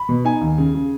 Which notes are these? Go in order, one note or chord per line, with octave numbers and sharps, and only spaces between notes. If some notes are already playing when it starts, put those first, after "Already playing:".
Already playing: B5
B2
D#4 G#5
D#2
C#3
C#3